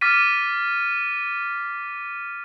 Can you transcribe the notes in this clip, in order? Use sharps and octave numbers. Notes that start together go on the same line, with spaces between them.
D6 F6 A6 B6 D#7